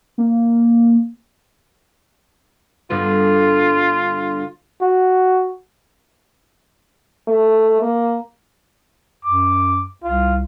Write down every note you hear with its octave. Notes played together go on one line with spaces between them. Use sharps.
A#3
G2 D3 B3 F4
F#4
A3
A#3
F#2 D6
C2 F4